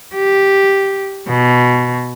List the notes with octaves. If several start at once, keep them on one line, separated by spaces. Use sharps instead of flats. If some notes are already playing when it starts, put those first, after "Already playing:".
G4
B2